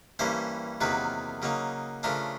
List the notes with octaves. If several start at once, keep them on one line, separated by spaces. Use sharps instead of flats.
G2 E3 G3 A#3 C#4 C5
E2 C3 D#3 F#3 A#3 B4
C#3 F#3 A#3 D#4
C#3 F3 A3 D4 A#4